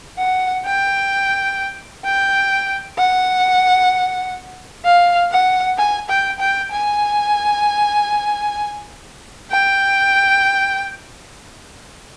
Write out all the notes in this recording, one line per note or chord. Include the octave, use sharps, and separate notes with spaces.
F#5
G5
G5
F#5
F5
F#5
G#5
G5
G5
G#5
G5